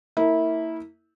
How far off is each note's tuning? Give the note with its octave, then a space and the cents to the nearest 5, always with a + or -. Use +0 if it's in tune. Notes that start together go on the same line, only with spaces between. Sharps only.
A#3 -25 E4 -20